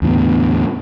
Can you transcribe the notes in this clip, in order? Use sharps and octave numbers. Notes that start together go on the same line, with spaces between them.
E2 A2 D3 B3